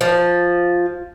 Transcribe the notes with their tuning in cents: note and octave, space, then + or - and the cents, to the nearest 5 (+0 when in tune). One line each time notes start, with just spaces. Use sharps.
F3 +5